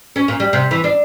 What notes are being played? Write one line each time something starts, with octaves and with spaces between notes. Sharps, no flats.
C#4
A#2
G3
C3
E3
D4